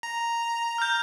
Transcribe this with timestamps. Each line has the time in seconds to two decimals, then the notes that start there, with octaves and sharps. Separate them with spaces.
0.03 A#5
0.78 F6 G6